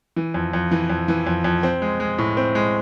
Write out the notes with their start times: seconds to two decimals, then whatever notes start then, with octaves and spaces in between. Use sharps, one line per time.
0.16 E3
0.34 F2
0.53 F2
0.71 E3
0.90 F2
1.08 E3
1.27 F2
1.44 F2
1.63 C4
1.82 G#3
2.00 G#3
2.19 A2
2.37 C4
2.55 G#3